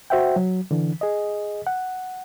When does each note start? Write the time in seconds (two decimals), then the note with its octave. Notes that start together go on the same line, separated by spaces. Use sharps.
0.10 F#4 C5 E5 F#5 G5
0.36 F#3
0.71 D3 E3
1.01 G#4 D#5
1.67 F#5